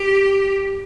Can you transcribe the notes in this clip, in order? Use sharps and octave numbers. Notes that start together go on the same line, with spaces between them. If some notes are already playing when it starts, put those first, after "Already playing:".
Already playing: G4